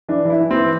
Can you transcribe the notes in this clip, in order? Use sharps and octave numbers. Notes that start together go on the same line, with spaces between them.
E3 D4
E3 E4
E3
C4
E3